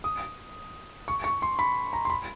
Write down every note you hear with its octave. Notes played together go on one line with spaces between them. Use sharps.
D#6
C#6
C#6
C6
B5
A#5
C6
B5